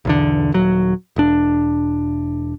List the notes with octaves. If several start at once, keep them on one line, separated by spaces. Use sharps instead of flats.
B1 E2 D3
D#1 F#3
E1 D4